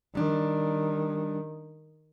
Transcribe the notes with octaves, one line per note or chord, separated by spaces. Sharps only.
D#3 G3 D4